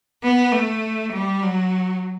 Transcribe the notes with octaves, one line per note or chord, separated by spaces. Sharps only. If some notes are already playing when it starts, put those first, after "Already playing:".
B3
A3
G3
F#3